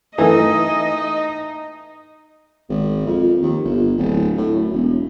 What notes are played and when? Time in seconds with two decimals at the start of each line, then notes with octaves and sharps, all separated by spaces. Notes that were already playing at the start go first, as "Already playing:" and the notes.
0.18 E3 A3 D#4 D#5
2.69 G#1
3.06 F2
3.42 D#2
3.65 G1
3.98 D1
4.38 A2
4.56 F#2
4.74 E1